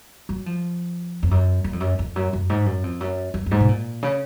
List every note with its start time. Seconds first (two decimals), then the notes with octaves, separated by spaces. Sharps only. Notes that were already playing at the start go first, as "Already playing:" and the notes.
0.29 F#3
0.46 F3
1.23 F2
1.31 F#2
1.64 F#2
1.73 F2
1.80 F#2
1.99 F2
2.16 F#2
2.33 F#2
2.50 G#2
2.66 F#2
2.84 F2
3.00 F#2
3.34 F#2
3.46 F#2
3.51 G#2
3.60 B2
3.69 A#2
4.03 C#3